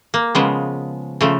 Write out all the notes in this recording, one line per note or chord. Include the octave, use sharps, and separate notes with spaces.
A#3
C#3 F3 G#3 B3
C#3 F3 A3